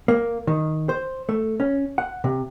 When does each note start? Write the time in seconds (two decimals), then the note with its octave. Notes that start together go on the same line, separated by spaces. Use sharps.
0.08 A#3
0.47 D#3
0.89 C5
1.29 A3
1.60 C#4
1.98 F#5
2.24 C3